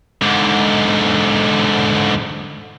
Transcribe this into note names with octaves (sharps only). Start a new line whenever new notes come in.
G#2 D3